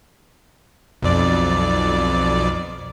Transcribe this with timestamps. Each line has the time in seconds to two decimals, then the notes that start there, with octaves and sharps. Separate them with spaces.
1.02 B1 F2 D5